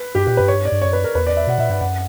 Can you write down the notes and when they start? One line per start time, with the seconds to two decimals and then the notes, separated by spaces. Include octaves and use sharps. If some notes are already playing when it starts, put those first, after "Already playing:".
Already playing: B4
0.15 G2 G4
0.27 A#2 G4
0.37 G2 B4
0.48 C#5
0.65 D5
0.72 G2
0.82 F#2 C#5
0.93 B4
1.04 A#4
1.15 E2 B4
1.27 D5
1.37 E5
1.47 B2 F#5
1.58 A#2 E5
1.70 G2 F#5
1.81 F#2 F#5